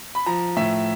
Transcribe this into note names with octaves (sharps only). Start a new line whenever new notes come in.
B5
F3 A#5
A2 E5